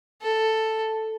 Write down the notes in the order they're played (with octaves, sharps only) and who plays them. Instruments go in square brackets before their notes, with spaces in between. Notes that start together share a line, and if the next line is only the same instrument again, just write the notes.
[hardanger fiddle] A4